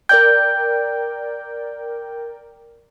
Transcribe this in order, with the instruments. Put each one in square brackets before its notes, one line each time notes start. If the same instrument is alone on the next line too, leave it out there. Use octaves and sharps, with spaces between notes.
[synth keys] A#4 D5 G5 [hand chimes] G6